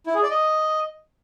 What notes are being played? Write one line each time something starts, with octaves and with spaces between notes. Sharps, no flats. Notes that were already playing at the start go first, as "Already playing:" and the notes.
E4
G#4
D5
D#5